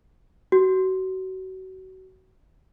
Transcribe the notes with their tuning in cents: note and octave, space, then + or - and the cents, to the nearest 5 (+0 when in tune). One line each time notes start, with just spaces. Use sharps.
F#4 +30